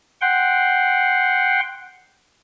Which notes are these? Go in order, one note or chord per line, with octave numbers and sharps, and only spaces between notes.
F#5 G5 C6